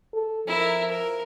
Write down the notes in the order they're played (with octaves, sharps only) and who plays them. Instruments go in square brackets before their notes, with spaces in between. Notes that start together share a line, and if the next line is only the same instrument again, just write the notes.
[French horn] A4
[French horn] F3 [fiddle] E4 A#4
[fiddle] A#4